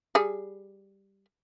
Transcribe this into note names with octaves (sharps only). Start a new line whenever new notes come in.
G3 G#4